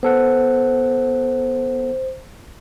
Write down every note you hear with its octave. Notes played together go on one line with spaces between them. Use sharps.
B3 A4 C5 F#5